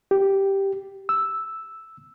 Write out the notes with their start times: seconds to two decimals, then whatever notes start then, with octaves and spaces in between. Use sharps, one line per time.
0.11 G4
1.09 E6